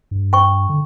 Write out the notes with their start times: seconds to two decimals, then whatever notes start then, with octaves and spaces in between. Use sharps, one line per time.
0.11 G2
0.33 G5 C#6
0.69 D3